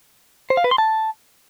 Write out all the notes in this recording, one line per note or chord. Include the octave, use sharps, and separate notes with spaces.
C5
F5
B4
C6
A5